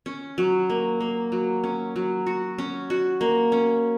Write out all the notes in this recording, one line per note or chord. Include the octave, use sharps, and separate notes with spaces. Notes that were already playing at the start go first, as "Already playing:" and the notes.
C#4
F#3
A#3
A#3
F#3
C#4
F#3
F#4
C#4
F#4
A#3
C#4